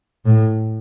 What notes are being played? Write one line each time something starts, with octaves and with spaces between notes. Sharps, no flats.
A2